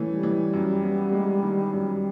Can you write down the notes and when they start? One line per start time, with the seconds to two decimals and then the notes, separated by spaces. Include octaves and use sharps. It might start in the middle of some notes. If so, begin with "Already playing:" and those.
Already playing: E3 A3 C#4
0.08 G3
0.23 E3
0.53 F#2
0.83 B3
1.13 G#3
1.42 D#3
1.73 F#2